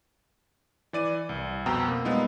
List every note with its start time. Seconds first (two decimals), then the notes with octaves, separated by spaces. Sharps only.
0.93 E3 D5 D#7
1.29 C2
1.66 F2 B2 G5 A#5 E6
1.88 A#3 C4
2.05 G3 G#3 B3 D#4 F4